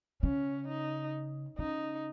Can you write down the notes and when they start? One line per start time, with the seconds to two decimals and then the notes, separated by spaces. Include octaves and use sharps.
0.23 C#3 C#4
0.68 D#4
1.58 C#3 D#4